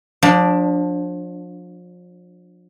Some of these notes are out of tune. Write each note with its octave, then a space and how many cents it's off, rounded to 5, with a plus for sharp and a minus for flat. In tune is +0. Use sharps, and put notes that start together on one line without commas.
F3 +35 D4 +0